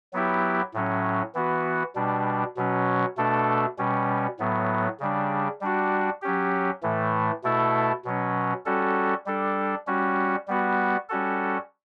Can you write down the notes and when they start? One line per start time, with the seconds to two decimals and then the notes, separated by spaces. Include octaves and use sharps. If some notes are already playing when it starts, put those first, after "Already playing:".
0.13 F#3 B3 E4 G4
0.74 A2 F#3 C#4
1.35 E3 B3 F#4
1.95 B2 G3 D4
2.57 B2 F#3 C#4
3.17 B2 A3 D4 A4
3.78 B2 G3 C#4
4.39 A2 F#3 B3
5.00 C#3 G3 D4
5.61 G3 D4 F#4
6.22 F#3 C#4 G4
6.83 A2 E3 A3
7.44 B2 A3 E4 A4
8.05 B2 F#3 C#4
8.66 G3 C#4 F#4 A4
9.26 G3 D4 A4
9.87 G3 C#4 F#4
10.48 G3 B3 F#4
11.09 G3 C#4 F#4 A4